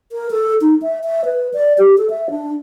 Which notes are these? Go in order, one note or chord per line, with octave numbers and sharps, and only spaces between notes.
A#4
A4
D#4
E5
E5
B4
D5
G4
A4
E5
D4